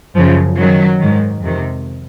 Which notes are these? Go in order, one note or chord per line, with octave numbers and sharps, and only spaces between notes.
F#2 C#3 F3
F#2 D#3 F#3
G#2 D#3
F2 C3 D#3